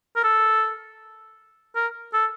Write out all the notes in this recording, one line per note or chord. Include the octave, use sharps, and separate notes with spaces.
A#4
A4
A#4
A4